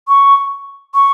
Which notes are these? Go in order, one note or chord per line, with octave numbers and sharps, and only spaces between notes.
C#6
C#6